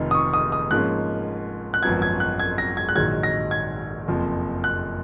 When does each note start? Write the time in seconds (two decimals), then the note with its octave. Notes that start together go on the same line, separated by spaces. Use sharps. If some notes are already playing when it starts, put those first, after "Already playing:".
Already playing: F1 F2 D#3
0.11 D#6
0.15 C#6
0.34 D#6
0.52 D#6
0.71 G#2 F3 A#3 C#4 F#6
1.74 F#6
1.83 G#1 F#2 F3 B3 G#6
2.02 G#6
2.20 F#6
2.39 G#6
2.58 A#6
2.77 G#6
2.89 F#6
2.95 A#1 G#2 D#3 F#3 G#6
3.23 A#6
3.51 G#6
4.08 F#1 F2 F3
4.64 F#6